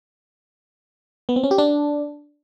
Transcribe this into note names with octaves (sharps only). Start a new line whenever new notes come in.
B3
C4
C#4
G4
D4